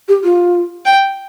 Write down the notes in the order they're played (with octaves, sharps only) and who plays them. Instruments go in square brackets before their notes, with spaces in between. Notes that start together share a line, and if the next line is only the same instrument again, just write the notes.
[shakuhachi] G4
F4
[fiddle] G5